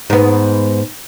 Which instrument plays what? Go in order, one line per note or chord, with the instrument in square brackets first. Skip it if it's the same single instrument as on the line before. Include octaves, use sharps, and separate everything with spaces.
[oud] G#2 B3